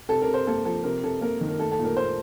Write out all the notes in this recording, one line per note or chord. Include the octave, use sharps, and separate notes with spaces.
C3 A4
A#4
C3
C5
A#3 A4
F3 A4
C3 A#4
C3 A4
A#3 A#4
D#3
A#4
A3 A4
A4
A#2
A#4
A#2 C5